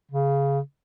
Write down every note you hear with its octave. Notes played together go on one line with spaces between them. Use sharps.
C#3